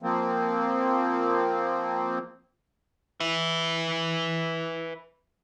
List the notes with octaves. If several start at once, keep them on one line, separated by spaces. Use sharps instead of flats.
F3 A#3 C4
B4 E5